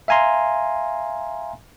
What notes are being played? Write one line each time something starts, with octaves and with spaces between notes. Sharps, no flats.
E5 F5 G#5 A#5 C6